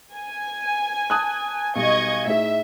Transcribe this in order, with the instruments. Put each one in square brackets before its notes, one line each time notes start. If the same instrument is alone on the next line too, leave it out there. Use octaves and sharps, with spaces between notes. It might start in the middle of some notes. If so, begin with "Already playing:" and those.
[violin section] G#5
[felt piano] A5 D#6 F#6
[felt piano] B1 G3 [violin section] D#5 C#6 G#6
[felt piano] A2 D#4 G#4 [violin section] E5